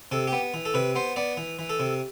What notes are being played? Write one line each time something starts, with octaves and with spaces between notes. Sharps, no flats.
C3 A4
G4
B3
E3
A4
C3 B4
B3 C5
B3 D5
E3
E3
A4
C3